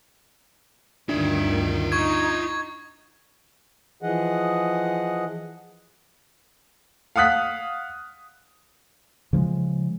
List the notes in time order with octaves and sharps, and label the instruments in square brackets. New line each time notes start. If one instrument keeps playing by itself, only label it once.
[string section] D2 G2 D#3 [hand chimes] D4 [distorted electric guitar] F4 E5
[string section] D#4 [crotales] C#6 G#6
[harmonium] E3 F3 G#4 D#5 F#5
[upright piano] F5 F#5 D#6 F#6 B6
[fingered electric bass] C#3 F3 F#3 G#3